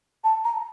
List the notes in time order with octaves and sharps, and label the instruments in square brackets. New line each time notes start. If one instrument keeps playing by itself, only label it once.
[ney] A5
A#5